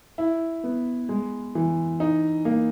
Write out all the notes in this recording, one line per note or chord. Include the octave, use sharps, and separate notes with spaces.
E4
B3
G#3
E3
D#4
A#3